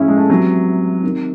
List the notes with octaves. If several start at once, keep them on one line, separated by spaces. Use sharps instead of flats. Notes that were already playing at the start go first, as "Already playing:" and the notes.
Already playing: A2 F3 C#4 E4 G#4
G#3
A3
C3 E3 F#3
C3 D#3